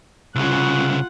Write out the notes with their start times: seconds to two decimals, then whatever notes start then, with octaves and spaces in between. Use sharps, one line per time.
0.35 C2 C#3 F4 F#5